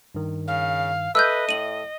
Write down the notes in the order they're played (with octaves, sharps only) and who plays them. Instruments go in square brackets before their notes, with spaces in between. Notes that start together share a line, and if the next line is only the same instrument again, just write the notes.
[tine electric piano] G2 D#3
[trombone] C#3 [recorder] F5
[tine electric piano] A4 E5 [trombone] B4 [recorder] D#5 [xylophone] E6 F#6 G6
[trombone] A2 [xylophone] D#7 F#7